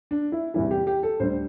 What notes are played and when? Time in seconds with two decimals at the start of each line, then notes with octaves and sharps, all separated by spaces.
0.11 D4
0.32 E4
0.54 E2 C3 E3 G3 E4
0.71 G4
0.87 G4
1.03 A4
1.19 D2 D3 G3 C5